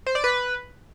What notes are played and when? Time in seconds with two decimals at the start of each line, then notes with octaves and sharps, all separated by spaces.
0.06 C5
0.15 D5
0.24 B4